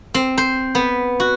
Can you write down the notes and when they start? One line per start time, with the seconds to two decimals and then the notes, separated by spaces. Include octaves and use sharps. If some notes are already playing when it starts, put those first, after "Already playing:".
0.14 C4
0.38 C5
0.75 B3
1.20 F#4